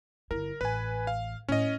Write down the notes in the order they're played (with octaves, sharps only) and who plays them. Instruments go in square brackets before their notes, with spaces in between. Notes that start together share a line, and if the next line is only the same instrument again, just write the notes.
[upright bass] G1 E4 [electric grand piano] A#4
[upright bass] A1 [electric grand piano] B4 G#5
[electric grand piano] F5
[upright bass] A2 [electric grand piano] C#4 D#5